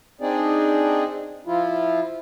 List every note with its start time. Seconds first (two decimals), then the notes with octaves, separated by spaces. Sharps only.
0.21 C4 D4 D#4 G#4 D5
1.47 F3 E4 F4